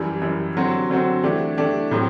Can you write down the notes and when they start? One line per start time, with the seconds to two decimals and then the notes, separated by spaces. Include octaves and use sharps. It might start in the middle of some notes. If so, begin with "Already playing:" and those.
Already playing: F#2 E3 G3
0.22 F#2 E3 G3
0.56 D3 F#3 C4 F#4
0.90 D3 F#3 C4 F#4
1.24 E3 A3 D4 G4
1.57 E3 A3 D4 G4
1.91 A2 F#3 C4 G4